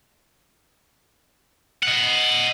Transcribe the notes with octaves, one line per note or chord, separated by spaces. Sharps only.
D#5 F#5